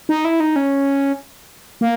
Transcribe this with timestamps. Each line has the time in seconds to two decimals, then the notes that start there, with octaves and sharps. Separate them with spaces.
0.09 D#4
0.25 E4
0.40 D#4
0.56 C#4
1.81 A#3